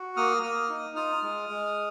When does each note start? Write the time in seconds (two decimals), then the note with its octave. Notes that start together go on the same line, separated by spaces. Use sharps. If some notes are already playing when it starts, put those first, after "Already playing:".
Already playing: F#4
0.17 A#3 D#6 F6
0.43 A#3 D#6 F6
0.69 D#4
0.96 F4 D#6 F6
1.23 G#3
1.49 G#3